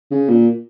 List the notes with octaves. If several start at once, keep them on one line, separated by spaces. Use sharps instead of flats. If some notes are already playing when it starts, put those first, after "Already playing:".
C#3
A#2